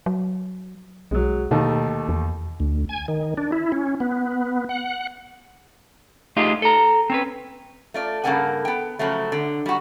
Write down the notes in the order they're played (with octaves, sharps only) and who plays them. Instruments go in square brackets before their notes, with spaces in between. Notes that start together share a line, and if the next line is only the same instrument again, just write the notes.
[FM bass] F#3
[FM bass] B1 [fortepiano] F#3 G#3
[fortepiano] D#2 A3 D#4 [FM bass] B2
[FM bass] E2
[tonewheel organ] D2
G#5
D#3
D4
E4
C#4
B3
F#5
[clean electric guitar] A3 D#4 F4 G4 G#4
A4 A#5
C4 C#4 B4
[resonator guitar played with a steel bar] A3 F4 D5
G2 C#3 A#3 A4 F#5 G#5
B3 G5
C#3 F3 F#3 A3
D3
G3 F#4